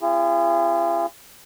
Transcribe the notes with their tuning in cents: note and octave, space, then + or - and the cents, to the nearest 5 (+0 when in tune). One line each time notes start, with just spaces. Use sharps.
C4 -5 F4 -45 G#4 -30